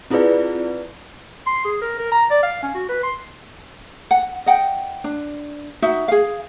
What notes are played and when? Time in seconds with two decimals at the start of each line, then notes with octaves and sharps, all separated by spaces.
0.10 C4 E4 F4 G#4 B4 D5
1.47 C6
1.65 G#4
1.81 A#4
1.99 A#4
2.11 A#5
2.30 D5
2.43 F5
2.63 C#4
2.75 F#4
2.89 B4
3.03 C6
4.11 F#5
4.46 D#5 F#5 G5
5.04 D4
5.82 D#4 F#4 E5 F#5
6.08 G#4 F5